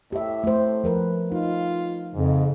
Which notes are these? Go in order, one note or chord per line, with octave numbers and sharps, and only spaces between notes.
A2 G4 E5
A3 C5
F3 A#4 B4
D#4 F4
F2 G#2 C#3